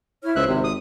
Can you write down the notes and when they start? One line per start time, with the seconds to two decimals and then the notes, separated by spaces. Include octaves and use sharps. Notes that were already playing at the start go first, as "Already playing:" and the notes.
0.23 E4 C#5 F6
0.36 C#2 C5 E5 F#6
0.48 G#1 C3
0.64 D#6